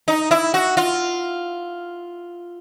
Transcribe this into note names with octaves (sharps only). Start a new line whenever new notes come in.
D#4
E4
F#4
F4